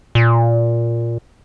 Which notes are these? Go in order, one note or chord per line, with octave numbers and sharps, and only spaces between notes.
A#2